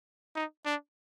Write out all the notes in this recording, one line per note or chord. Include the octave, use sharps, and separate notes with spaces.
D#4
D4